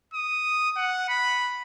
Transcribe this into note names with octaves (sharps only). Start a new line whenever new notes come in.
D#6
F#5
B5